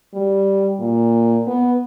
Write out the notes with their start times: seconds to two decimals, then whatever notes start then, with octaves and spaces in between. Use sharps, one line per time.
0.14 G3
0.79 A#2
1.47 B3